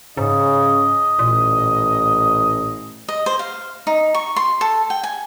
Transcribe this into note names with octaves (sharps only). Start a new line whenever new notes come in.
G#2 C#3 D#5
A1 A#2
D#5
C5
F5
D#4
C#6
C6
A4
G5
G#5